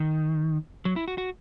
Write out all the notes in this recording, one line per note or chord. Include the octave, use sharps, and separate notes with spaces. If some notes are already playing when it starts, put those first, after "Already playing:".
Already playing: D#3
F#3
E4
F#4
F#4